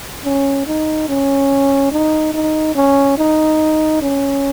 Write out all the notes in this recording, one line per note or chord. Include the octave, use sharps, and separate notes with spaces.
C#4
D#4
C#4
D#4
D#4
C#4
D#4
C#4